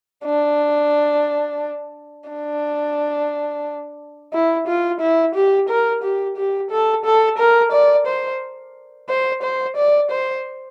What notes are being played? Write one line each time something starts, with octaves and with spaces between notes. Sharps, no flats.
D4
D4
E4
F4
E4
G4
A#4
G4
G4
A4
A4
A#4
D5
C5
C5
C5
D5
C5